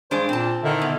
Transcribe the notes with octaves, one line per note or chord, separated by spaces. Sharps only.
G2 G#3 D4 C5
A#2 C4 A5
D3 D#3 E4
B2